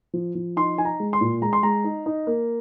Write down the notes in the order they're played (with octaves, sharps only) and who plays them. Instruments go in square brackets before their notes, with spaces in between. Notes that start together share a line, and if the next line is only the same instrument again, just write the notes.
[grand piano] F3
F3
D#4 C6
D#4 G#5
A#5
G#3
C6
A#2
G#3 A#5
C6
G#3 A#5
D#4
D#4
A#3